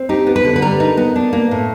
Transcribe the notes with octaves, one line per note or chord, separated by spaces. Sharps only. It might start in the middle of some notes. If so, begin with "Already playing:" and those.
Already playing: C4
D#4 G4
B3
B4
D3
B4
G3 A#4
D#4
B3
D4
A#3
A2